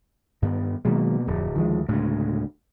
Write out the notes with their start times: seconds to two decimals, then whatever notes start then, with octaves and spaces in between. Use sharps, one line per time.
0.42 G2 D#3 B3
0.85 B2 D#3 F#3 G#3 A#3
1.27 D1 F2
1.56 D2 D#3 F3 G#3
1.89 D2 A2 C#3 G#3